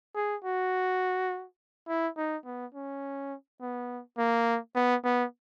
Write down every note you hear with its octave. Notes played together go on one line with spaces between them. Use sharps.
G#4
F#4
E4
D#4
B3
C#4
B3
A#3
B3
B3